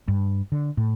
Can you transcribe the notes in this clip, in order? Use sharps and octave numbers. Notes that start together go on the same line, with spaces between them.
G2
D3
A2